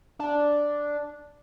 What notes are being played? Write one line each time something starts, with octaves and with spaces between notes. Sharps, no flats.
D4